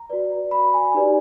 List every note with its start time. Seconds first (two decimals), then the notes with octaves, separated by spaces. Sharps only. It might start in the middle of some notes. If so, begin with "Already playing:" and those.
Already playing: A#5
0.10 F#4 B4 D5
0.51 B5
0.74 G#5
0.94 D#4 G4 B4 D5